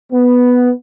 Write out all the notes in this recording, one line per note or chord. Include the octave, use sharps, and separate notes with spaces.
B3